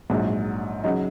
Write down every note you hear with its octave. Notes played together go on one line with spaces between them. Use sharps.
A#1 G#2 F#3
C#3 F#3 D#4